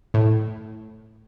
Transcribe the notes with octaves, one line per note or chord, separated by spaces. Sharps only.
A2